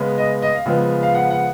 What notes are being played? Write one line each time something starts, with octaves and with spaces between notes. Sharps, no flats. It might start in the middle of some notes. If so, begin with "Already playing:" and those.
Already playing: C#3 G#3 B3
D#5
D#5
F5
C#3 F3 G#3 B3
F5
F#5
F#5